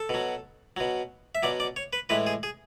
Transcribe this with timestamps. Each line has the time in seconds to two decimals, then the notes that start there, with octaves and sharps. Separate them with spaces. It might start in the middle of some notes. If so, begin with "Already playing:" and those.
Already playing: A4
0.09 B2 F#3
0.77 B2 F#3
1.35 E5
1.43 B2 F#3 D5
1.60 D5
1.76 C#5
1.93 B4
2.09 A2 E3 G#3 B4
2.27 G#4
2.43 G#4